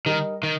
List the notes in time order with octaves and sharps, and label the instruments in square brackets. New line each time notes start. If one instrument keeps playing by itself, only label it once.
[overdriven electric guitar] D#3 [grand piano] G3 D#4 A#4 D#5
[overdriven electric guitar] D#3